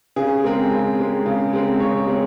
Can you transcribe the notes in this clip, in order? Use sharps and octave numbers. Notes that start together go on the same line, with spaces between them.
C#3 G#4
G#3 C4 A#4
C#3
G#3 C4
C#3
G#3 C4
C#3 C#5
G#3 C4